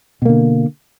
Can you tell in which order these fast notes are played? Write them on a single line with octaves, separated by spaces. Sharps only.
B2 A#3 D3